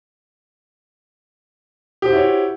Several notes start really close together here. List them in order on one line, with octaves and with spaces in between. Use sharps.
G4 C5 F#4 E4 C#5